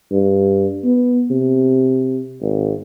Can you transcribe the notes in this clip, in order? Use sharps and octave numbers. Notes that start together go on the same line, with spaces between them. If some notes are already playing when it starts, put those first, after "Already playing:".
G2
B3
C3
G#1